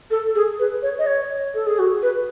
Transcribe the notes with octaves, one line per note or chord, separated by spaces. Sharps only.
A4
G#4
B4
C#5
D#5
C#5
A4
G#4
F#4
B4